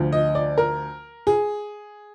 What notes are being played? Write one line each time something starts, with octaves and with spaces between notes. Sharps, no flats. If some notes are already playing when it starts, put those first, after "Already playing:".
Already playing: D2 D3 F3
D#5
D5
A#4
G#4